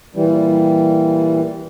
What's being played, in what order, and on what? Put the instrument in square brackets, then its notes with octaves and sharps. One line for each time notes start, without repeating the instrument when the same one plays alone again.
[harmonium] A#2 E3 G3